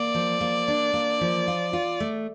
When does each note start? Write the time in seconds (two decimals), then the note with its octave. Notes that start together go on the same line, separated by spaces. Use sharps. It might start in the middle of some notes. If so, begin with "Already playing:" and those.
Already playing: A#3 D5
0.14 F3
0.41 A#3
0.68 D4
0.94 A#3
1.21 F3
1.48 F4
1.73 F4
2.00 A3